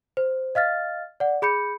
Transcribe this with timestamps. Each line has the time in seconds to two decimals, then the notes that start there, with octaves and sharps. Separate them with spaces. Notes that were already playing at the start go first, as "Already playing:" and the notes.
0.17 C5
0.55 D#5 F5 F6 A6
1.20 D5 F#5
1.42 G#4 B5 G6 C#7